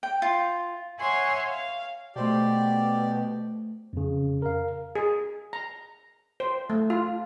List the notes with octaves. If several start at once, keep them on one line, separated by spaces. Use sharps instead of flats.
G5
F4
C#5 E5 F#5 G#5 C6 C#6
F5
B2 A3 G4 C5 D5 G5
F2 C#3
A#4 F5
G#4
A#5
C5
A3
F4